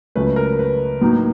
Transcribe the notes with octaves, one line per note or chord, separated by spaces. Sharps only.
C#2 C#3 F#3 A3 C#4 B4
A#4
B4
A2 F#3 A#3 D#4